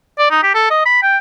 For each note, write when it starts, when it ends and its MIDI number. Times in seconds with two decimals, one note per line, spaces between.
0.19 0.27 74
0.31 0.41 63
0.43 0.53 67
0.55 0.68 69
0.70 0.84 75
0.86 1.01 83
1.03 1.18 79